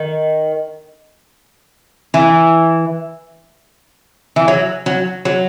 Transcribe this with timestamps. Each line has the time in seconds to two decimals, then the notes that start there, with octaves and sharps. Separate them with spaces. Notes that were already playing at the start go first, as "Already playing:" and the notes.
Already playing: D#3
2.14 E3
4.36 E3
4.48 F#3
4.86 F#3
5.25 F#3